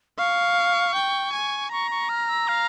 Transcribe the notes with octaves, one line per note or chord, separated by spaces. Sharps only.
F5 C#6
G5
G#5
A#5 C#6
C#6
F6
E6
F5